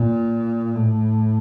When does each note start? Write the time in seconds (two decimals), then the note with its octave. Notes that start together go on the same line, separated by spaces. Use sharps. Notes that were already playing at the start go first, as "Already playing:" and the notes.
Already playing: A#2
0.75 A2